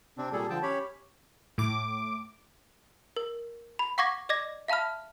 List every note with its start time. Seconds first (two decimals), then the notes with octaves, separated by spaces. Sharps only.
0.18 C3 C4 D4
0.33 A#2 G3 G#4 A4
0.50 D3 F3 G5 A5
0.63 C#4 G4 C#5 B5
1.58 A2 D6
3.16 A#4
3.79 B5
3.98 F5 F#5 C#6 D6 G#6 A#6
4.29 D5 D#5 D6 G#6 A#6
4.68 E5 F5 A5 B5 F6